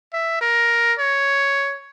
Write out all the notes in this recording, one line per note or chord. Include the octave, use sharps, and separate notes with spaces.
E5
A#4
C#5